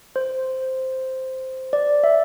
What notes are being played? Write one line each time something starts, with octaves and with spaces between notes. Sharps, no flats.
C5
D5
E5